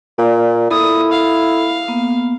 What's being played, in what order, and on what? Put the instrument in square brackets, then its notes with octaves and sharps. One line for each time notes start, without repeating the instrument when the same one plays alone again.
[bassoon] A#2 [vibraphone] D5
[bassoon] E4 [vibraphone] A4 [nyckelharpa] D#6
[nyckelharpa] F5
[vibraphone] A#3 B3